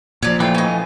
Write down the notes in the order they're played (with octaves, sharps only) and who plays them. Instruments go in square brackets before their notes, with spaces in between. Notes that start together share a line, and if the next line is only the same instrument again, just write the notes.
[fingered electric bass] A#2 F3 [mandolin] C#5 D5
[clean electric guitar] E3 A3 F4 [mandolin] G5
[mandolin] C#4 D#5